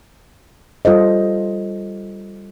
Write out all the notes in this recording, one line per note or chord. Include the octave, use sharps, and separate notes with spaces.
G3 F4 A4 C5 D#5